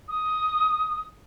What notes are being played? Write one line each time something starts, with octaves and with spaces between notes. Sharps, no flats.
D#6